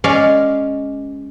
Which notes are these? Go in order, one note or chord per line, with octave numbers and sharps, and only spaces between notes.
G#3 C#4 D5 F5